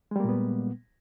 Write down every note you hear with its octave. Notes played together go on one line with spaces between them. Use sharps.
A#2 G3 G#3 A#3 B3